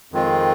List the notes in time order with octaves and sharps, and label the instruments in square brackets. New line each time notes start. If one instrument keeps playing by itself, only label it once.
[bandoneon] F2 D#3 G#3 C4 F4